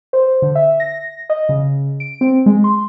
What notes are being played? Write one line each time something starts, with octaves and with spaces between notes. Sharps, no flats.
C5
D3
E5
A#6
D#5
C#3
D7
C4
G#3
C6